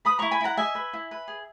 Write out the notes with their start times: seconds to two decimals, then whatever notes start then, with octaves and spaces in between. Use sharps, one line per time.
0.05 B4 B5 D#6
0.19 E4 A#5 C#6
0.31 G#5 B5
0.41 E4 F#5 A#5
0.57 D#5 E5 G#5
0.75 B4
0.93 E4
1.11 B4
1.28 G#4